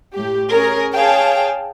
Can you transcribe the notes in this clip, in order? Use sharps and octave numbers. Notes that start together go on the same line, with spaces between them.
A2 G4
C#4 G#4 A#4
G#4 C#5 F5 G5 A5